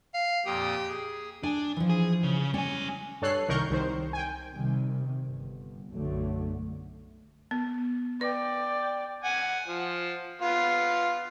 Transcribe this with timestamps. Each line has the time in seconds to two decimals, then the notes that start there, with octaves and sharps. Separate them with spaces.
0.14 F5
0.46 F2 A#2 G4 D#6
0.88 G#4
1.43 D4 G#5
1.77 E3 F3
1.89 G#4
2.23 C#3
2.54 G3 C#4 G#5
3.22 G2 A4 C#5 F#6 C7
3.48 C2 D#3 A#4 C#6 G6
3.70 C2 D#3 C5
4.13 G5 G#5
4.52 C3 D#3 G3
5.23 G1
5.91 B1 F#2 D3 F#3 A3
7.51 B3
8.21 B4 D5 G5
9.25 F#5 G#5
9.67 F3
10.42 B3 F4